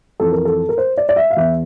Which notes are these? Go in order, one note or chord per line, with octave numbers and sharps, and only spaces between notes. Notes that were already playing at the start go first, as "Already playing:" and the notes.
F2 E3 A4
A#4
A4
A#4
C5
D5
D5
E5
F5
E2 E3 E5